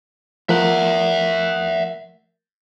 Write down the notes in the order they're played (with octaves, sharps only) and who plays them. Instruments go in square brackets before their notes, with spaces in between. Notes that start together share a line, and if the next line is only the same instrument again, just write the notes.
[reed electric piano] F3 A3 A#4 [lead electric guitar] E5 F#5